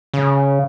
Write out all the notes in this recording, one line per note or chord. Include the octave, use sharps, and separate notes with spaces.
C#3